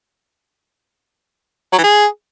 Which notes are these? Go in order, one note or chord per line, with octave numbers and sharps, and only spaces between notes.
F#3
E3
G#4